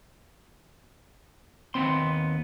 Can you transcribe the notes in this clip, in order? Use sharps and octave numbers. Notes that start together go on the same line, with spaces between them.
D#2 B3 C4 C6